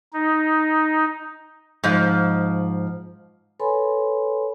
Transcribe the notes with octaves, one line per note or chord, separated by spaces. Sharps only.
D#4
G#2 F3
A4 B4 C#5 G#5 B5 C6